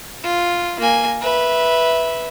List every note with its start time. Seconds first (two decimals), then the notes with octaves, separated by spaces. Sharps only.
0.23 F4
0.79 A#3 G#5
1.21 B4 E5